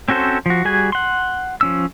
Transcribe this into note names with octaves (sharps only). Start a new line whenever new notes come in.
C4 C#4 F#4 A4 C5
F3 F#4
G3 F#4 G#4 G#5
F#5 C6
F3 C#4 E6